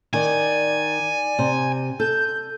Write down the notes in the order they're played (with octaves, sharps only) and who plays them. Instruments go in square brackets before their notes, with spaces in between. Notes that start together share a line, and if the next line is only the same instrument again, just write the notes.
[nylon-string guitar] D#3 [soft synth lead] D5 [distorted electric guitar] G#5
[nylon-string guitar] C3
[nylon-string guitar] A4 [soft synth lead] G6